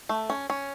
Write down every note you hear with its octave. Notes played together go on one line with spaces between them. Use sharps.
A3
C#4
C#4